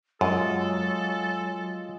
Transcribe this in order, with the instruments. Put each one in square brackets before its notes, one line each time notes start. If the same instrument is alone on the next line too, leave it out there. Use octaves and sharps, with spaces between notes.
[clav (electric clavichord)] F#2 [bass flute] F#3 [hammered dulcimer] G#3 F4 [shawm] A4